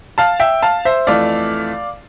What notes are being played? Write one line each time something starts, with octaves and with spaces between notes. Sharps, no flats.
F5 A5
E5 G5
F5 A5
C5 E5
F2 E3 A3 D5 F5